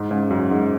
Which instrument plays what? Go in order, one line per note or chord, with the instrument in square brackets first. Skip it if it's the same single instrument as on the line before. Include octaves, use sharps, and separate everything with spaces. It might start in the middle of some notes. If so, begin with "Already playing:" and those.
Already playing: [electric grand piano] G#2 [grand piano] G#3
[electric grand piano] G#2 [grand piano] C#3
[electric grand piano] F#2 [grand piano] F#4
[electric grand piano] G#2 [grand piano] G#3